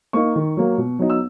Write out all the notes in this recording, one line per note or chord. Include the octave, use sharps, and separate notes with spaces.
A#3 D#4 C#6
D#3
F#3 A#3
B2
F#3 B3 D#4
E6